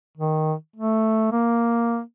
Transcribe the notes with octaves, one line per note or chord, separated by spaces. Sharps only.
D#3
A3
A#3